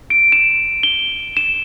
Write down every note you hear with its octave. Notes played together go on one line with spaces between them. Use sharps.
D7
E7
G7
E7